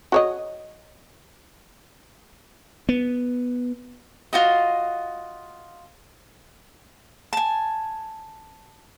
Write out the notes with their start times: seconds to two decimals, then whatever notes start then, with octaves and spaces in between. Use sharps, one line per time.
0.12 F#4 C#5 D#5
2.89 B3
4.33 F4 F#4 D#5
7.33 G#5 A5